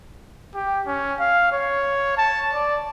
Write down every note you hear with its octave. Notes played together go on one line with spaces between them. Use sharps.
G4
C#4
F5
C#5
A5
D5